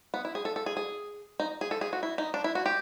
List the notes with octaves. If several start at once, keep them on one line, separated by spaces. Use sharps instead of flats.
B3
E4
G#4
A4
A4
G#4
G#4
D#4
G#4
A4
G#4
F#4
E4
D#4
D4
E4
F#4
G4